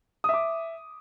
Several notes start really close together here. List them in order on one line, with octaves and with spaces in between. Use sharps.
D#6 E5 D6